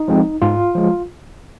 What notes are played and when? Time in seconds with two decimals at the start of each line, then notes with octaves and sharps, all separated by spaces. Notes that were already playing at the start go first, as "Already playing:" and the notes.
Already playing: D#4
0.08 F3 G#3 C4
0.42 G#2 F4
0.75 F3 G#3